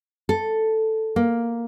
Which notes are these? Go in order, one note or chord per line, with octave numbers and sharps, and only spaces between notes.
A4
A#3